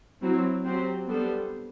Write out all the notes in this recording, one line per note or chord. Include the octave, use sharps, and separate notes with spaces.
F#3 C4 E4
F#3 C4 G4 C5
G3 B3 D4 A4 C5